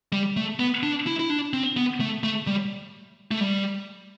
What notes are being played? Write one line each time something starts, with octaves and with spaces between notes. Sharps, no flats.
G3
A3
B3
D4
E4
E4
D4
C4
B3
A3
A3
G3
A3
G3